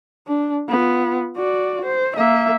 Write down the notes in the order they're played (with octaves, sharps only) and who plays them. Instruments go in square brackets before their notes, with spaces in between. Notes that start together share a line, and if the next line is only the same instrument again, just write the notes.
[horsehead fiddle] D4
B3 F4
F#4 D5
C5
A#3 E5